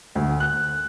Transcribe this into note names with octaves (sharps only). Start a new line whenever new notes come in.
D2
F#6